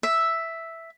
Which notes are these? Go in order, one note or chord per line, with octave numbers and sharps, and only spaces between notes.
E5